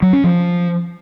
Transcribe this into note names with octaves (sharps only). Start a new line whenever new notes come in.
F#3
C#4
F3